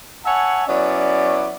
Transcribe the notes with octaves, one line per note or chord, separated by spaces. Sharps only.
C#5 E5 F#5 G#5 A5
F#3 B3 C#4 E4 D5